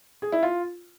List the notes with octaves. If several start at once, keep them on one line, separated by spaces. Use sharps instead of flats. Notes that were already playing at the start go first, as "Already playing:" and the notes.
G#4
E4
F4